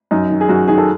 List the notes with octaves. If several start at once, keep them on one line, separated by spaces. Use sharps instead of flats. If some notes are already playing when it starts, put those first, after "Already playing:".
F#2 D#4
D#3
G#4
F#2 F#4
D#3 G#4
A4